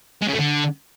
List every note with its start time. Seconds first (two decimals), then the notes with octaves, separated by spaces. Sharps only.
0.21 G#3
0.27 C#3
0.33 A3
0.39 D3